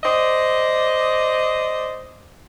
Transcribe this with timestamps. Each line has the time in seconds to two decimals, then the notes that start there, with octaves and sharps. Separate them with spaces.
0.04 C5 D5 D#5